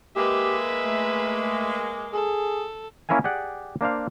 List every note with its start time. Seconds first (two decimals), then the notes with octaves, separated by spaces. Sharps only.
0.16 G#3 A#3 G4 B4 E5
0.84 A3
2.13 G#4 A4
3.09 A#3 C#4 E4 A#4 F5 G#5
3.24 G4 G#4 D5 F#5
3.81 A#3 D4 C5 F5